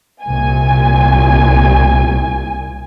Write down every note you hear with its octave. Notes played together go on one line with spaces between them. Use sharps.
C2 A#2 G#5